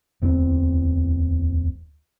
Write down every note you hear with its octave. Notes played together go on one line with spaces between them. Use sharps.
D1 E2 G3 C4